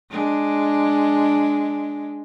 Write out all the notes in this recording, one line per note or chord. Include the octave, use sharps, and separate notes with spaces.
G#3 D4